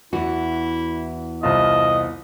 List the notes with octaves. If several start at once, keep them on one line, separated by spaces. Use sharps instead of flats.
E2 E3 E4 F#4
C2 C4 F4 D#5 A5